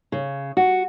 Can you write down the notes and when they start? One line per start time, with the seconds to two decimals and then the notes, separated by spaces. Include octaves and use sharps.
0.12 C#3
0.57 F#4